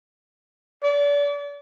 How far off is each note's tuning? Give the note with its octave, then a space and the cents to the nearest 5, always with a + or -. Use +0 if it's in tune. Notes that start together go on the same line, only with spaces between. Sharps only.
D5 -35